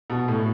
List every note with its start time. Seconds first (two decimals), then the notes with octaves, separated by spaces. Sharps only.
0.10 B2
0.28 A2